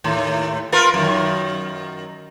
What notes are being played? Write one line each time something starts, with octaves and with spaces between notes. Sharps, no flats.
D#2 A2
F4 A#4 B4
F#2 D#3